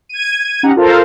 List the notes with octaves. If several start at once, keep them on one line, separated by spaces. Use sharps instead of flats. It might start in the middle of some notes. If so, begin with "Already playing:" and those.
G#6 D#7
C#4 D#4 G4 F#5 A#5
F4 A4 A#4 C5 F5